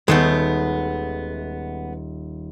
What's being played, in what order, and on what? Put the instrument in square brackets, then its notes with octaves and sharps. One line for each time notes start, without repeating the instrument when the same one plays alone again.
[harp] D#1 G6 E7 [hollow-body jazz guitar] G#3 A3 B3